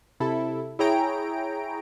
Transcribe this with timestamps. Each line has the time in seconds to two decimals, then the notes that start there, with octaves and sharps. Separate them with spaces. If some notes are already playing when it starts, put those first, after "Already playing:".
0.20 C3 E4 A4
0.79 E4 G#4 C#5 G5 A#5 D7